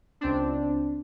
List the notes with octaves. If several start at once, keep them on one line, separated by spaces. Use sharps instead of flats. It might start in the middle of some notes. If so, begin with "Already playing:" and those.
C#2 C4 D4